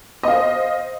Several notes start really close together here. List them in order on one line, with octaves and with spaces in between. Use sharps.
D#5 F5 C5